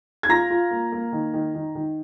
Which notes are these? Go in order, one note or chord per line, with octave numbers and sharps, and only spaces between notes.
G#6
F4 A#5 A#6
F4
A#3
A#3
D#3
D#3
D#3
D#3